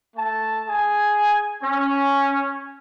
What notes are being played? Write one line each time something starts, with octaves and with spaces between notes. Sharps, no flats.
A3 A5
G#4 G#5
C#4